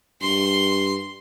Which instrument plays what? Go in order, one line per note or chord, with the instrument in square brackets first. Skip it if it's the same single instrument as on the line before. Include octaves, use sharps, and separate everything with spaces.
[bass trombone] G2 [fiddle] C6